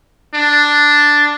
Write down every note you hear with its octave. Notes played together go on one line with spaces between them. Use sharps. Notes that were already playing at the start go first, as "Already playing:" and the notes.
D4